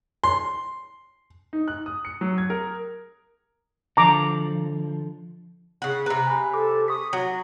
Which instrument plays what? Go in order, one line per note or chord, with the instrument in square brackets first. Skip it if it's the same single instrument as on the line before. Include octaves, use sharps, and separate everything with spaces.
[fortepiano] C6
[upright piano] D#4
F#6
D#6
C#7
F#3
G#6
A#4
[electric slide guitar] D3 F3 [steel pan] A#5 D6
[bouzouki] C#3 F#5
[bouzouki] C3 B4 [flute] A#5
[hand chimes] G#5 B5
[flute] A4 [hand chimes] D6
[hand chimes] C#6 B6 [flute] D#6
[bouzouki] F#3 [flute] F#4